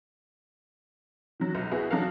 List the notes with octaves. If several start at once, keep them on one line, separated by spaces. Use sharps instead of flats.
D#3 F#3
B1
B3 E4 F#4 G#4
F#3 D4 D#4 A4 F5